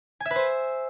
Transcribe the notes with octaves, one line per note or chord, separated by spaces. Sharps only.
G#5
E5
B4
C5